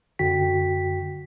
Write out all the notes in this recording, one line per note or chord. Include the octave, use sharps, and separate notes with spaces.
F#2 D3 F#4 G5 B6